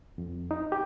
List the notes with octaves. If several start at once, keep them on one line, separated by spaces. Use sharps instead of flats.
F2
D#4
G4